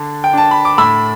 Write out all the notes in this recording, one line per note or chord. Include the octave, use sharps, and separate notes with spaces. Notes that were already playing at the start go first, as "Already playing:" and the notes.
Already playing: D3 D4
G5
D4 A5
B5
D6
A2 B5 E6